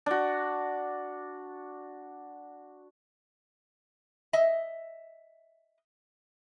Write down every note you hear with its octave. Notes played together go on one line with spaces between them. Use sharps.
D4 F#4
D#5 E5